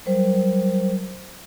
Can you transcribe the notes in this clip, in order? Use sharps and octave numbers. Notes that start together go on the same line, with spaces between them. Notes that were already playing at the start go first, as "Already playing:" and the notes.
F#3 G3 A#4 C5